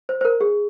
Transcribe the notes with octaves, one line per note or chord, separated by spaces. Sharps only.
C5
C5
A#4
G#4